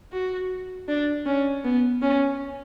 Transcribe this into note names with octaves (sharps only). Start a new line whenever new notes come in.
F#4
D4
C#4
B3
C#4